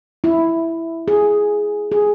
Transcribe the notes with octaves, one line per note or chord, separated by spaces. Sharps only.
E4
G#4
G#4